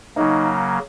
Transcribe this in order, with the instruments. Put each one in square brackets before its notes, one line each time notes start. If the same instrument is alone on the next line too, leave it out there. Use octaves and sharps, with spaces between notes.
[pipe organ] C#3 F#3 A#3 [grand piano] D#4